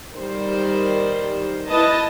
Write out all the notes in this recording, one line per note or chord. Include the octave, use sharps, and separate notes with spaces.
D#3 G3 C5
E4 B4 D#5 A5